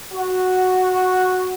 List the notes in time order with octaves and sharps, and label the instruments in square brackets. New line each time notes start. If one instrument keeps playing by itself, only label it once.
[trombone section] F#4